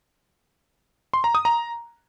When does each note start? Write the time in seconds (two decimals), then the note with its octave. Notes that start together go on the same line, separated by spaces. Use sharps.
1.14 C6
1.24 A#5
1.35 D#6
1.45 A#5